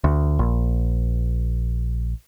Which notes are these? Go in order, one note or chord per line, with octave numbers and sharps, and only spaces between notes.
D2
A#1